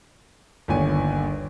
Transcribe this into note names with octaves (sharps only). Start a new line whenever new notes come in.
G1 D#2 D4 C#5 G#5